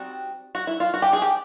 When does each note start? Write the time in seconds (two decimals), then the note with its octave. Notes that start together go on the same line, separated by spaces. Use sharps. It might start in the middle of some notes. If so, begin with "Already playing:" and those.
Already playing: G3 C4 D#4 F#4
0.55 F#4
0.67 E4
0.80 F4
0.94 F#4
1.02 G4
1.13 G#4
1.22 G4